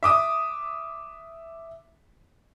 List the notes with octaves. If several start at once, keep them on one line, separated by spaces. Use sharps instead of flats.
E5 D6 D#6